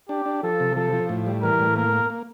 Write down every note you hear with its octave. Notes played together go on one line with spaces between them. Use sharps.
D4 G4
D4
F3 A4
C3
F3 A4
F3
A2
G3
E3 A#4
A2
A#3 A#4
A#3
A#3